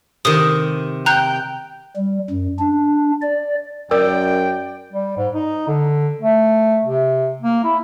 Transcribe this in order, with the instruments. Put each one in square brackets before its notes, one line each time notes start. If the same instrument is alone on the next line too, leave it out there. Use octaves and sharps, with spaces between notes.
[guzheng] C3 D#3 [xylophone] D#6
[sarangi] G5 [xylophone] A#5 F#6 G6
[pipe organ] G3
F#2
D4
D5
[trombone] F#2 [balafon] A#4 [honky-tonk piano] D5 [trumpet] G5
[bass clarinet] G3
G#2
D#4
D3
A3
C3
A#3
E4